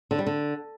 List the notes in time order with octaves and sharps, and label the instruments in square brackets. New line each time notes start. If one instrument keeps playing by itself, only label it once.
[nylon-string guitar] D3
G3
D3